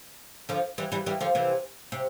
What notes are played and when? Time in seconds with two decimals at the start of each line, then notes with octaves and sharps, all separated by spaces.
0.49 D3 F3
0.78 E3 G3
0.92 E3 G3
1.06 E3 G3
1.21 D3 F3
1.35 C3 E3
1.92 C3